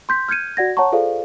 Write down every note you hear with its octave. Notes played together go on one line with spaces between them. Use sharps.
C6 G6 B6
F6 G6 G#6 C#7 D#7
F#4 D5 F#5 G#6 A#6
C#5 F#5 A5 A#5 C#6
F4 G#4 A4 C5 D5 F5